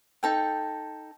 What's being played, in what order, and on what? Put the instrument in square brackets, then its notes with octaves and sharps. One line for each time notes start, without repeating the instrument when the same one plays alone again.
[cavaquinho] D#4 A4 G5